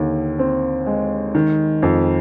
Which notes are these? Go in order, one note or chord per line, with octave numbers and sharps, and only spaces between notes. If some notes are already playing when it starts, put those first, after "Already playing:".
Already playing: D#2 D3
C4
G#3
D#3
F2